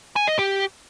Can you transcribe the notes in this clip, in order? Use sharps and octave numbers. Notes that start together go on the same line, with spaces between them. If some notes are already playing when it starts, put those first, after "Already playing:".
G#5
D#5
G4